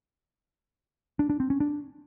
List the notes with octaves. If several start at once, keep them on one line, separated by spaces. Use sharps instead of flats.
D4
D4
C4
C#4
D4